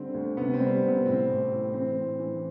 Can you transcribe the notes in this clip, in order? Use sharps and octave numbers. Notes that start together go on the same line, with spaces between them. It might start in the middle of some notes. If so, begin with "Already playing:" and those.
Already playing: D3 G3 C4
D2
C3 B3
C4
G3
C4
C3
B3
A2 C4
A1
A2
E3 C4
A2
E3